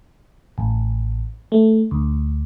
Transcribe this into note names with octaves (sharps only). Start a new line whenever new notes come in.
A1
A3
D2